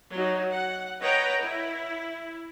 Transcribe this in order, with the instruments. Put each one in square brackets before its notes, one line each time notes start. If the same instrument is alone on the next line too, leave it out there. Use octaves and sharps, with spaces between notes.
[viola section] F#3 D#4
F#5
B4 C#5 D#5 F#5 G5 A#5
E4